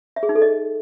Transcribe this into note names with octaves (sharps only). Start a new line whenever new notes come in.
E5
G#4
D#4
A4
D#5